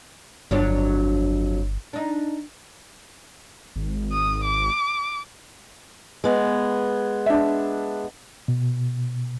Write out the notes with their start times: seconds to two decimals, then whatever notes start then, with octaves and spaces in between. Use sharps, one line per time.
0.51 G1 F2 F#3 D4
1.93 D4 D#4
3.76 G#1
4.12 D#6
4.44 D6
6.24 G#3 B3
7.26 D4 E5
8.48 B2